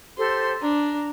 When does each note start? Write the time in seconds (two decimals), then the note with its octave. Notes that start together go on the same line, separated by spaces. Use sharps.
0.17 G4 A4 C5 C6
0.62 D4 A#5